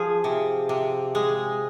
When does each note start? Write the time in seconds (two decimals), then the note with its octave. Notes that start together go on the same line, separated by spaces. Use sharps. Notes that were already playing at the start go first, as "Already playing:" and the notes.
Already playing: F3 G#4
0.24 C3
0.69 C3
1.15 G#3